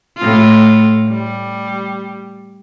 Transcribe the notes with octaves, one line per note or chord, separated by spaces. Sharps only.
A2 F4
G3